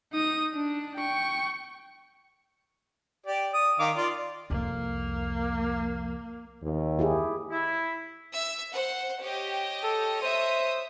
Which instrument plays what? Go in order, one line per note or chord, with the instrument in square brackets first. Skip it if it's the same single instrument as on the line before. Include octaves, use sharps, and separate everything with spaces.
[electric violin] D#4 D#6
D4
G5 C#6
[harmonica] G4 D5
D#6
D#3 F5 D6
F4 D5
[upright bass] C2 F2 [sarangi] A#3
[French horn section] D#2
[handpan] E4 G4 G#4
[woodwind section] E4
[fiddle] E5 E6
[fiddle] C5 [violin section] F#5
[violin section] G4 [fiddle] C#5 D#5
[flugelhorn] A4
[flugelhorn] C5 [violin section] E5 D#6